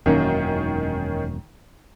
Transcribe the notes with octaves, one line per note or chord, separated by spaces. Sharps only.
E1 F#2 D#3 A#3 C#4